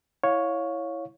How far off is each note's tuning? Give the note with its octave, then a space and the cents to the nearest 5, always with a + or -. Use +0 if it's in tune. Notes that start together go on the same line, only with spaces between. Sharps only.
E4 +0 C#5 +0 F5 +25